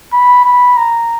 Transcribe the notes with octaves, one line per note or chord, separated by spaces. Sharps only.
B5
B5
A#5